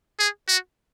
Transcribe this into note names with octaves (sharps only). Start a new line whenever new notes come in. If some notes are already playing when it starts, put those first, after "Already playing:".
G#4
F#4